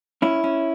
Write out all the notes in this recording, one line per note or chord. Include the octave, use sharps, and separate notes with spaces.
C#4 E4
C#4